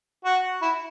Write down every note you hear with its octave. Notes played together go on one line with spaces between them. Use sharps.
F#4
E4